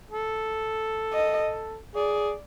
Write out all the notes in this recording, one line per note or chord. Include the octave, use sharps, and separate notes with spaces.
A4
D#5
G#4 D5